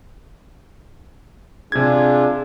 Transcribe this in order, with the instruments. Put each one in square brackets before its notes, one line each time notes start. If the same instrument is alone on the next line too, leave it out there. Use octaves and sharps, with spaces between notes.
[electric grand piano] C3 G#6 [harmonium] D4 F4 G#4